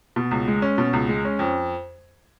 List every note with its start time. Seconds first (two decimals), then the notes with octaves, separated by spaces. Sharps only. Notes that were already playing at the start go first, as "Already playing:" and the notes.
0.16 B2
0.31 C#2
0.48 G#3
0.62 C#4
0.78 B2
0.93 C#2
1.09 G#3
1.25 C#4
1.39 F2